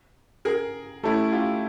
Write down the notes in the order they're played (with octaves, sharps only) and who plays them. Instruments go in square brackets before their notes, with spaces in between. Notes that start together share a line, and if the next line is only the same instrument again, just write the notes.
[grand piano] G#4 A#4
[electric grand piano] A3 C#4 E4 [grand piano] G4 A4
[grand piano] F4 G4